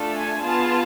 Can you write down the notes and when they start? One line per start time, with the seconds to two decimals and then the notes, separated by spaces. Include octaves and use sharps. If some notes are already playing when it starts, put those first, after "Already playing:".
Already playing: A3 D4 F4 A4
0.14 G#5
0.42 B3 F4 G#4 A5